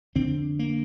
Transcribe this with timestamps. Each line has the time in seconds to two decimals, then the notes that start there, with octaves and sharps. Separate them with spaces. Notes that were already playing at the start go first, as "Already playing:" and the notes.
0.15 F2 D3 C4
0.59 A#3